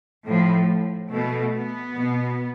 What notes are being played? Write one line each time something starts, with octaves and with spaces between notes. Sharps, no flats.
A2 F3
B2 A3
B3
B2